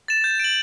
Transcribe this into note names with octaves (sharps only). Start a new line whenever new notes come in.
A6 E7
G6
D7 F#7